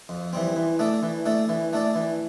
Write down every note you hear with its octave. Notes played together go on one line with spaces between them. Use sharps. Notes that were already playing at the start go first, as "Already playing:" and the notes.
F2
E3 G3 C4
E3
A3 D4 A4 D5
E3
A3 D4 A4 D5
E3
A3 D4 A4 D5
E3